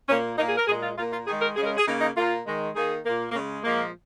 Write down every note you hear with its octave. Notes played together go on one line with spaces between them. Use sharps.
A#2 A#3 C#4
A#2 A#3 D#4
G#4
A#4
A#2 G#3 G#4
F4
A#2 A#3 F4
F4
D#3 G#3 G#4
A#4
C#3 G#4
G#3 A#4
G#4
C#3 A#3 D#4
D#4
A#2 A#3 F4
D#3 G#3
D#3 A#3 G#4
A#2 A#3
A#3
C#3 G#3 C#4
A#2 F3 G#3 A#3